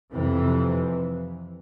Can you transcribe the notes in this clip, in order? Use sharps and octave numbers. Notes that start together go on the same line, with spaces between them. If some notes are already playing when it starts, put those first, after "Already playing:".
F2 C3 E3